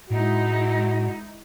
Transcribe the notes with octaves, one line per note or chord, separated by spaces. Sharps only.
A2 G#3 D#4 E4 F#4